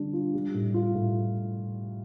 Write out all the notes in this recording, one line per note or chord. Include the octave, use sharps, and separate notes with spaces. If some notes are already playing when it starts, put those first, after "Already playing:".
Already playing: D3 G3 D4
F4
G3
A2
F4
A2